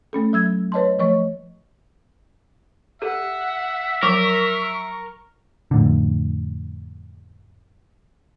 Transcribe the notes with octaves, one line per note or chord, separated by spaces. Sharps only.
A3 C#4 A4
F#3 E6 G#6
B4 C#5 D#5 A5 C6
F3 A3 C#5 D#5 C#6
G4 A4 E5 F#5
F3 F#3 A#4 C#6 D6
F2 A2 D3